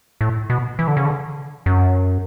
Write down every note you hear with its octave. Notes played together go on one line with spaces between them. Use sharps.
A2
B2
E3
D3
C#3
D3
F#2